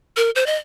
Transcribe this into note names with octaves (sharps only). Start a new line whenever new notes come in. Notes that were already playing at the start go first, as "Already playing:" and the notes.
A#4
C5
D#5